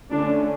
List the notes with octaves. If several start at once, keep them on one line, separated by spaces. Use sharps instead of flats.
D3 A3 C#4 D4